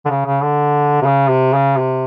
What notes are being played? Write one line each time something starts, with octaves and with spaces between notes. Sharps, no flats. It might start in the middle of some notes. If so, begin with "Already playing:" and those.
D3
C#3
C#3
D3
C3
C#3
C3
C#3
C3